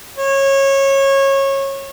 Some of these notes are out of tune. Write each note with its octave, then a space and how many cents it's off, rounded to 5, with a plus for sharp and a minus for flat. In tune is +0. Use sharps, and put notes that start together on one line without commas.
C#5 -20